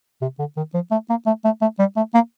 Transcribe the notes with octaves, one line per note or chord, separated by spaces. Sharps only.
C3
D3
D#3
F3
A3
A#3
A3
A3
A3
G3
A3
A#3